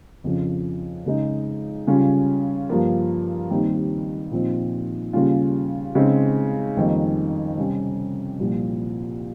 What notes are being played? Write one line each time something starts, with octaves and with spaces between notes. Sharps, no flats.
F2 C#3 F3
C#3 G#3 D#4
C#3 G3 C#4 F4
G2 F3 A#3 F4
D#2 D#3 G3 C4 D#4
A#2 F3 C4 D#4
D#2 C#3 G3 C#4 F4
C#3 G#3 C4 D#4
F2 D#3 G3 A#3 D#4
C3 G3 C#4
C2 A#2 F3